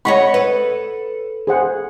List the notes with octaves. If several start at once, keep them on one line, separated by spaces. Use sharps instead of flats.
C#5 D#5 F#5 B5 C#6
A4 B4
G#4 C5 F#5